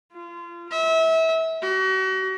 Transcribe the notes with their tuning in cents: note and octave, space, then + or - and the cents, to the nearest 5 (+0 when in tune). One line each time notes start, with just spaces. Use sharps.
F4 -30
E5 -25
F#4 +40